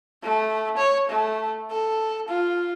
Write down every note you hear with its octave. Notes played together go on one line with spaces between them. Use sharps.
A3
C#5
A3
A4
F4